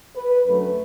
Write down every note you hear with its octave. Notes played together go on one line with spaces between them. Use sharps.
B4
F#2 D3 F#3 A3